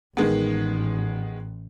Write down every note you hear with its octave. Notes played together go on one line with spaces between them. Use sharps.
A1 D#3 G#3 B3